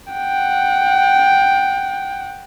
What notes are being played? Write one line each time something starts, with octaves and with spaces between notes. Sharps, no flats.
F#5 G5